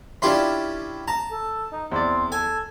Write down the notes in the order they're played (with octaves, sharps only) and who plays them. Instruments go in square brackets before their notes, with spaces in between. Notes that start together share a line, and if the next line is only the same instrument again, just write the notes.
[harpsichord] C#4 E4 G4 [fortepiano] D4 F4 C6
[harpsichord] A5 [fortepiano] A#5
[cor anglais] A4
D#4
[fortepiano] E2 D5 [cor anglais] C4
[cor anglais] A4 [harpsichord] G#5